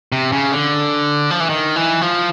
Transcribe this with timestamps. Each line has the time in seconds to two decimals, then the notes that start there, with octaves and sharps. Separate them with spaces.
0.12 C3
0.32 C#3
0.52 D3
1.31 F3
1.40 E3
1.49 D#3
1.76 E3
2.01 F3